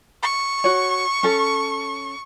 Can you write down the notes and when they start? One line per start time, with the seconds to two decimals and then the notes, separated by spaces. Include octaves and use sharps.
0.23 C#6
0.64 F#4 C#5
1.23 C#4 A4